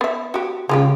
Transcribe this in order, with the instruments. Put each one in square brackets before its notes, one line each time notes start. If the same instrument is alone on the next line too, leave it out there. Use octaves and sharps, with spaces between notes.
[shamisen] B3 E5
F#4 G4
[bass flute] C#3 [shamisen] G#3 F4 G4